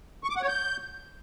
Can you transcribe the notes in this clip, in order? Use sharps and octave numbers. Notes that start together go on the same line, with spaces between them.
C#6
D6
F#5
C#5
G6